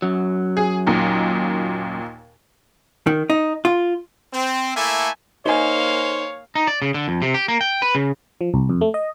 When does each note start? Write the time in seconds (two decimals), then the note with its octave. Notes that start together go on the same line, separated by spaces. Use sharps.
0.02 F#2 F#3
0.57 G#4
0.87 D#2 A#2 D#4
3.07 D#3
3.30 D#4
3.65 F4
4.32 C4
4.75 A3 A#3 E4 A4 E5 G#5
5.46 A#3 D#4 C5 C#5 F5 G#5
6.55 D#4
6.67 D5
6.82 C#3
6.94 D3
7.08 F2
7.22 C3
7.34 G4
7.48 A#3
7.61 G5
7.82 B4
7.95 C#3
8.41 F3
8.54 C2
8.69 F2
8.81 A3
8.94 D#5